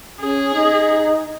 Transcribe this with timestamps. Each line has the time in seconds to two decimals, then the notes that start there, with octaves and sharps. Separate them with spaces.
0.21 C#4 G#4
0.54 D#4